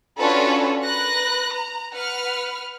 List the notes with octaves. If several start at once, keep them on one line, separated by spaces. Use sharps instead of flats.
C#4 D4 F4 F#4 A4 B4
A#4 B4 F#6 A#6
A#5
B4 F#5 F6